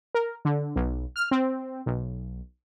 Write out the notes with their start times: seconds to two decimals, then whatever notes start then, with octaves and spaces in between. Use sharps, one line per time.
0.15 A#4
0.45 D3
0.76 B1
1.16 F6
1.31 C4
1.86 B1